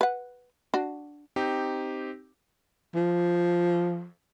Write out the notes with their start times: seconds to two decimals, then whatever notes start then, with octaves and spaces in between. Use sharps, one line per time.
0.01 B4 F#5
0.74 D4 F#4
1.36 C4 D#4 G4
2.95 F3